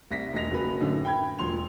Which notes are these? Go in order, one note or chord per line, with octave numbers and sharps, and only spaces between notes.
C2 A#6 B6
E1 D#5 A#6 F7
F#1 F#3 B4
F#2 A2 D3
G5 B5 G#6
E1 F3 C6 F7